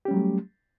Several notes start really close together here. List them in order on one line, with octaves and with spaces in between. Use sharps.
G4 C#4 G3 F#3 A3